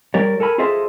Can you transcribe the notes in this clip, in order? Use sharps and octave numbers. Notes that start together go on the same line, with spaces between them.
G3 G4 A#4 C#5 D5
A4 A#4 G#5 B5
F4 G#4 A4 C5 D#5 E5